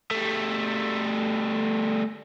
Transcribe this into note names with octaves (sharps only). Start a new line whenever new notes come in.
G3 A3